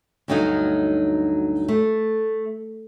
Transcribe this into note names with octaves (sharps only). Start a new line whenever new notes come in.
D2 G2 F#3 A3 D#4 F5
A3